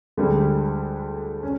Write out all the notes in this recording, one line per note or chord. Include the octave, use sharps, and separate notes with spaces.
D2 D3 G3 G#3 G#4
C#4